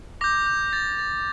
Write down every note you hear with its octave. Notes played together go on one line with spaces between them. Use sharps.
D6 G6 A#6
G6
A6
A6